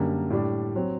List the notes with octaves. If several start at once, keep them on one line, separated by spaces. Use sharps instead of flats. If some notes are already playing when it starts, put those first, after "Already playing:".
Already playing: F#2 D3 G3 A#3
A2 G3 D4
F#3 C4